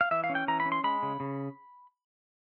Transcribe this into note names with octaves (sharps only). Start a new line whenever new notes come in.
F5
E3 E5
F5
C#4
G5
E3 A#5
B5
C#4
C6
G#3 B5
C#3
C#3